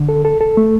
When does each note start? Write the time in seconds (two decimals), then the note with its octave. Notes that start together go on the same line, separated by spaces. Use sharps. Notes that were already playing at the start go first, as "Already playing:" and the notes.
Already playing: D3
0.09 A4
0.25 A4
0.41 A4
0.57 A3